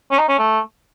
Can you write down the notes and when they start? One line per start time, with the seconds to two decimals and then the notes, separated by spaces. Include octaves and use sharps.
0.11 C#4
0.18 D#4
0.28 C#4
0.38 A3